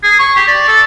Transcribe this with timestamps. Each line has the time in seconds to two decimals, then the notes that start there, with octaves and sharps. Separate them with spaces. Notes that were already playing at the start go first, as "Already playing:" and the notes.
0.03 G#4
0.19 C#6
0.36 G4
0.47 D5
0.68 A4